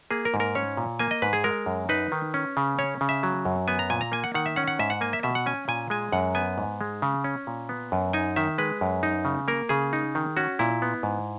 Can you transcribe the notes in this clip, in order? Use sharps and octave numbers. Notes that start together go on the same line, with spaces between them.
A#3 G#4
A#4
G#2
A#4
C#4 C#5
A#2
A#3 G#5
D#5
G#2 B4
G#4
G#3 A#4
F#2
D#4 B4
D#3
C#4
C#3
C#4 C#5
C#3
E5
F#3
F#2
B3 G#5
A#5
A#2 G#5
A#5
A#3 G#5
F#5
D#3 F#5
E5
C#4 F#5
F#5
G#2 E5
F#5
A#3 G#5
E5
B2 E5
F#5
C#4 G#5
A#2 G#5
G#3 G#5
F#2 F#5
B3 G#5
G#2
G#3
C#3
C#4
A#2
B3
F#2
D#4 G#5
D#3 E5
G#3 B4
F#2
D#4
C#3
A#3 A#4
C#3 G#4
D#4
D#3
C#4 F#4
A#2 E4
B3
G#2